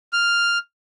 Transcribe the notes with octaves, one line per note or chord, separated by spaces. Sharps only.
F6